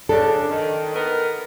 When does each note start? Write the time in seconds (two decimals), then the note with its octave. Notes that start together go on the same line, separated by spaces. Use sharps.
0.09 C#3 D4 A4
0.50 D#3
0.95 B3 A#4